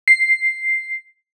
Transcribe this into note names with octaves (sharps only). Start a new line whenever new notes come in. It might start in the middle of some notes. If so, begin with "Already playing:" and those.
C7